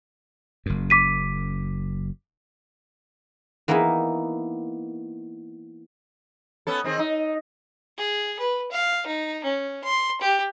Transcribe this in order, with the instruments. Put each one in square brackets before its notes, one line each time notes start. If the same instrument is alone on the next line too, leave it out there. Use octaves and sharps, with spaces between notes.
[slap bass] F#1 F#2
[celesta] D6 B6 D#7
[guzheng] E3 A#3 B3 D#4 E4
[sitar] B3 C#4 A4
D#3 C4 G#4
D#4
[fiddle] G#4
B4
F5
D#4
C#4
C6
G4